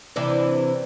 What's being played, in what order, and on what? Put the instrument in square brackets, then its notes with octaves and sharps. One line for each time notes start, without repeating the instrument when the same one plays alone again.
[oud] C3 E3 D4